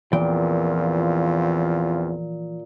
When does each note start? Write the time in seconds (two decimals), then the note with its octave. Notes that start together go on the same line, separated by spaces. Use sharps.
0.13 E2 A#2 E3 F3 C4 F4 G5